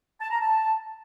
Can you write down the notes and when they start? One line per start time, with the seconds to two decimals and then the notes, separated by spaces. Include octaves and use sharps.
0.21 A5
0.31 A#5
0.41 A5